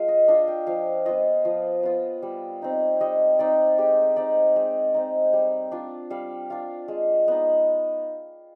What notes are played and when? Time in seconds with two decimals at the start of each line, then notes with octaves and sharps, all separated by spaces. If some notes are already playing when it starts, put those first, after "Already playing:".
Already playing: G#3 F4 F5
0.08 D#5
0.28 D4 F4 D#5
0.48 G5
0.67 F3 F5
1.06 B3 F4 D#5
1.45 F3
1.83 B3 F4
2.23 G3
2.62 C4 D#4
3.01 G3 D#5
3.39 C4 D#4 D5
3.78 G#3 G4
4.16 C4 D#4 D5
4.56 G#3
4.94 C4 D#4
5.33 G3
5.72 D4 F4
6.10 G3 F5
6.50 D4 F4 F5
6.88 G#3
7.28 B3 D#4